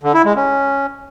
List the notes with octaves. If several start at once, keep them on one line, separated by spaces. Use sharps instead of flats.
D3
E4
G#3
C#4